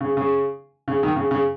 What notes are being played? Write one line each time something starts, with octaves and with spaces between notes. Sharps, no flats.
C#3
C#3
C#3
D#3
C#3
C#3